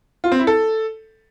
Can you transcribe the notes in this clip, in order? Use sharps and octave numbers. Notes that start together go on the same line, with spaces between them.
F4
C4
E4
A4